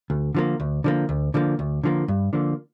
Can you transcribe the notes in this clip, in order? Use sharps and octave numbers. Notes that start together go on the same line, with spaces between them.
D2
D3 F3 A#3
D2
D3 F3 A#3
D2
D3 F3 A#3
D2
D3 F3 A#3
G2
D3 F3 A#3